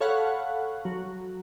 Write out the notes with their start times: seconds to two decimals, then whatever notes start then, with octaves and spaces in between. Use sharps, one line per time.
0.01 A4 C#5 F5 F#5 B5
0.85 F#3